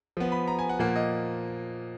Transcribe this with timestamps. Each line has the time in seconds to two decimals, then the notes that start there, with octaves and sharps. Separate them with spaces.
0.17 F3 B3
0.32 B5
0.48 A#5
0.59 G#5
0.69 F#5
0.79 A#2 F3 A#3 F#5
0.96 D#5